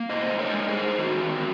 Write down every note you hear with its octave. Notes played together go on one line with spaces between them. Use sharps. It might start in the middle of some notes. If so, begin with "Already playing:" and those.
Already playing: A#3
A#2 C5 D#5
G#3
A#4 C#5
G#3
G#4 C5
G#3
D#3 F#4 A#4
D#3